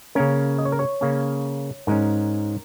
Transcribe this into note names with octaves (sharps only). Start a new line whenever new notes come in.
C#3 A#3 C#4 A#4
D#5
C#5
A#4
C#5
C#3 A#3 C#4
G#2 G#3 C#4 A#4